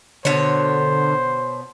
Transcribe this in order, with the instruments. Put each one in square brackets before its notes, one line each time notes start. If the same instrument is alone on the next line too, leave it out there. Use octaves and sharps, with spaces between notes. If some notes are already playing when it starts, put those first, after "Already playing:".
[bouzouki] B2 C#5 [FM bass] D3 [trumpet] C5